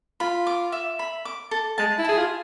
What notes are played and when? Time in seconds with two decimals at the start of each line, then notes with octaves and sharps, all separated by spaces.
0.20 F4 B5
0.47 D6
0.72 E5
0.99 B5
1.25 D6
1.51 A4
1.78 G#3 A5
1.98 E4
2.05 G#4 A5
2.18 F4